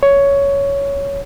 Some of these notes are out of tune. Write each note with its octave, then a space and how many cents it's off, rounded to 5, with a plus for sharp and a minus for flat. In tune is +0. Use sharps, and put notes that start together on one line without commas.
C#5 +10